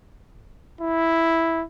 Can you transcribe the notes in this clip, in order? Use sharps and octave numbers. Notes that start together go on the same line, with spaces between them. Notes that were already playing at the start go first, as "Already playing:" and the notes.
E4